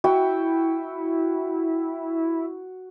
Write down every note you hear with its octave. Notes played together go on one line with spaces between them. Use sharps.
E4 F#4 G5